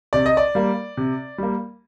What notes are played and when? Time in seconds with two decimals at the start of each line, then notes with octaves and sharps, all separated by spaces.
0.13 C3 D5
0.26 D#5
0.37 D5
0.55 G3 A#3
0.97 C3
1.38 G3 A#3